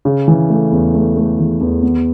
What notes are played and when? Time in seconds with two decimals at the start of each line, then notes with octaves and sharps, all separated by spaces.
0.05 C#3
0.28 E3
0.50 A3
0.72 E2
0.95 A3
1.16 A3
1.39 E3
1.61 E2
1.83 B3